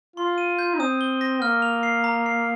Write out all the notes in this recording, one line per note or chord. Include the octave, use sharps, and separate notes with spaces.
F4 C6
D#7
G6
D#4
C4 D#6
G7
A#6
A#3 F6
F7
C7
A#5
C7